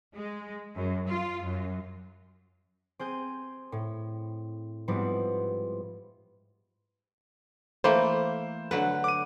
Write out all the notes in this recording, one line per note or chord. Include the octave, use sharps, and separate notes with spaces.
G#3
F#2
F4
F#2
C4 G#4 G6 D#7
A2
G#2 F3 G3 B3 C4 E4
E3 A3 A#3 C5 B5
D3 F#3 B4
D6 D#7